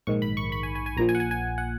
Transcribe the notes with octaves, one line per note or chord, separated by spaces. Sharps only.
A#1 G#2 D#3 C#6
B5
C#6
B5
G#5
G#5
G#5
A#1 A#2 F3 A#5
G#5
F#5
G#5
G#5
F#5